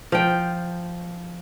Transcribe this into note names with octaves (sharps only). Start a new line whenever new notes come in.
F3 G5